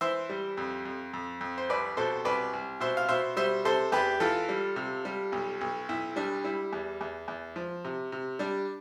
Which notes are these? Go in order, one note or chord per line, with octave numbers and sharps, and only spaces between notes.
E3 C5 E5
G3
F2
F2
F2
F2
C5
C2 B4 D5
B2 A4 C5
C2 B4 D5
C2
B2 C5 E5
F5
B2 C5 E5
G3 C5 E5
C3 A4 C5
E2 G4 B4
E3 F4 A4
G3
C3
G3
B1
B1
B1 E4
G3 D4
G3 E4
E2
E2
E2
F3
C3
C3
G3 D4